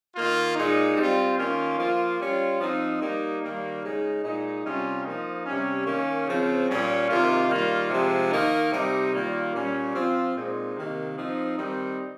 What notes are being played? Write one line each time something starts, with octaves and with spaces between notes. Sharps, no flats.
D#3 A#3 F4
A#2 G#3 D#4
G3 C4 F4
D#3 A#3 C#4 F4
F3 A#3 F4
G3 C#4 F4
F3 C4 D#4
G3 A#3 D#4
D#3 G3 A#3
C#3 G#3 D#4
A#2 G#3 D#4
C3 G3 C#4 F4
F3 A#3 D#4
C3 G3 C#4
D#3 A#3 C#4
C#3 F3 C4
A#2 G3 C#4
C3 D#3 A#3 F4
D#3 G3 A#3 F4
C3 F3 G#3
D#3 A#3 D#4
C3 G3 C4 D#4
D#3 G3 A#3 F4
A#2 G3 C#4
F3 C4 F4
A#2 G#3 C4 D#4
C3 D#3 A#3 D#4
F3 C4 D#4
D#3 G3 C4 D#4